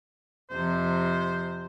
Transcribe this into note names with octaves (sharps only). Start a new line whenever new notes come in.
F2 C3 C5